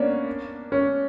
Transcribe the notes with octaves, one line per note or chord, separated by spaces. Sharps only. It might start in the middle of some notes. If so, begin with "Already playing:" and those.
Already playing: A#3 B3 C#4 D4
C#4